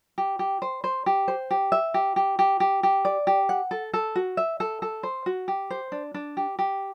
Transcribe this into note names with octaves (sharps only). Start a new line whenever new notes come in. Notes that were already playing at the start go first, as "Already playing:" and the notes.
G4
G4
C5
C5
G4
C5
G4
E5
G4
G4
G4
G4
G4
D5
G4
F#5
A4
A4
F#4
E5
A4
A4
C5
F#4
G4
C5
D4
D4
G4
G4